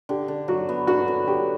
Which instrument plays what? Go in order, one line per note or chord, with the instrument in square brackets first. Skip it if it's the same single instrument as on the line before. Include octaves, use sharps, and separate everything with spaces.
[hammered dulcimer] D3 [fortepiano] G4
[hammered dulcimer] D3
[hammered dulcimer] F#3 [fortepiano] F#4
[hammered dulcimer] B3
[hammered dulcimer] D3 [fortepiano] F#4
[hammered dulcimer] D3
[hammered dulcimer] F#3 [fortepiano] G4